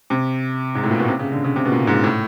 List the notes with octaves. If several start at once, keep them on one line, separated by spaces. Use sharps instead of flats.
C3
G#2
A2
A#2
B2
C3
C#3
D3
C#3
C3
B2
A#2
G#2
A2